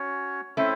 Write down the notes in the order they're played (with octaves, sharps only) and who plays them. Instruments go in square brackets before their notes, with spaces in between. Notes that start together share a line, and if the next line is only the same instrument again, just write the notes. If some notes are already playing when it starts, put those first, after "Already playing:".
Already playing: [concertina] C#4 F#4 C#5
[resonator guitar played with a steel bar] A3 C#4 [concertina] C4 E4 C5 E5